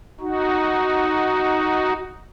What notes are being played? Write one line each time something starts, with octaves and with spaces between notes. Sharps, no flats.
D#4 F#4